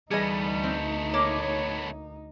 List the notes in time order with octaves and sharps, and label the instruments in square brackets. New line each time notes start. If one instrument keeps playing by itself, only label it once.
[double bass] D2 D#4 [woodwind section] E3 G3 [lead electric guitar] A3 B3 [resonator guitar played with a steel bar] G#4 D#5
[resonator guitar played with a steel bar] C4
[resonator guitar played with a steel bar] A#3 [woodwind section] C#5